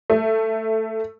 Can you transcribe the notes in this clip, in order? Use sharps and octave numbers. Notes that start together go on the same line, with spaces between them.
A3